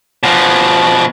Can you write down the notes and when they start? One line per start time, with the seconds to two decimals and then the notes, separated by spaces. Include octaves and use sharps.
0.23 B2 F3